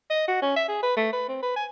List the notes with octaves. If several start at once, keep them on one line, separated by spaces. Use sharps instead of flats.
D#5
F#4
C#4
E5
G#4
B4
A3
B4
C4
B4
G#5